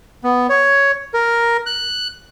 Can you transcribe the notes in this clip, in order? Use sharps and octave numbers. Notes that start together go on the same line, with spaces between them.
B3
C#5
A#4
F#6